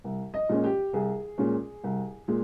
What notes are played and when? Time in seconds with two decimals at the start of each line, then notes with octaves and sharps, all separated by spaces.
0.04 C2
0.34 D#5
0.49 A#2 G#3 C#4
0.64 G4
0.93 C2 G#4
1.38 A#2 G#3 C#4
1.84 C2
2.28 A#2 G#3